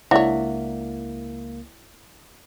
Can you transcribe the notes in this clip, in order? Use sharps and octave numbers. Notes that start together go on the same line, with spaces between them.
C#2 A#3 D4 E4 C#5 D5 E5 F#5